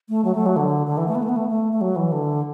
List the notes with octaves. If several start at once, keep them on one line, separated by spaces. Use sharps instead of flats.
A3
F#3
A3
F#3
D3
D3
E3
A3
B3
A3
B3
A3
A3
A3
F#3
E3
D3